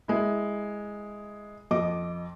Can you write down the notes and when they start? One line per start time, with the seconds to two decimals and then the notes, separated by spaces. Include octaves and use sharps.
0.08 G#3 E4
1.71 F2 D#5 D6